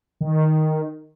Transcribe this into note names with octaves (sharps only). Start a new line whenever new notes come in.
D#3